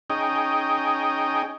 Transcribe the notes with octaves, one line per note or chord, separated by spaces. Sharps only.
C#4 D#4 G#4 D#5 G5